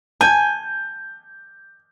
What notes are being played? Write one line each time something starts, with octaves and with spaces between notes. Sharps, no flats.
G#5 A5 G6